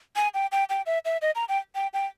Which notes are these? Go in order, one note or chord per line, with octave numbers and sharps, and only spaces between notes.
G#5
G5
G5
G5
E5
E5
D#5
A#5
G5
G5
G5